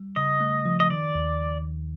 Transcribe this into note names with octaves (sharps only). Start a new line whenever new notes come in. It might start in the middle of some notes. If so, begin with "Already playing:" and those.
Already playing: G3
C#3 D#5
A3
F3
D#5
D#3 D5
D#2